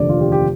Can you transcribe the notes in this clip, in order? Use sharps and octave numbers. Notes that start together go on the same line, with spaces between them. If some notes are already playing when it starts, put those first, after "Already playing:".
Already playing: F1 D#2 D3 D5
F4
G4
G4